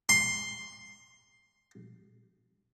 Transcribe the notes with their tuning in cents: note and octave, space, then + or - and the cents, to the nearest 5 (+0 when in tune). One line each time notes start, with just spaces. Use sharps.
C6 +5